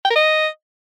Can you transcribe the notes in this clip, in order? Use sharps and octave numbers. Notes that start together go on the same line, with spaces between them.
G5
A#4
D#5